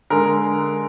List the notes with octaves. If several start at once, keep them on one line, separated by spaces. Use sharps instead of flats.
D3 G#3 A#4